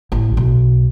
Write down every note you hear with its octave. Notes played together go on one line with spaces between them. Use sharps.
A1
B1